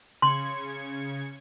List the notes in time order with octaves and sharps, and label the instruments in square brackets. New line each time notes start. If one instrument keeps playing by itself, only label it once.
[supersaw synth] C#3 G#6 C#7 [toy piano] C6